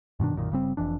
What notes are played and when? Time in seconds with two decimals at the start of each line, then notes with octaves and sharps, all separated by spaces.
0.20 G2 B2 D#3 D4
0.34 B1 F#2 A#2 D#3
0.50 G1 C#3 G3 C4
0.77 F1 F2 E3 D4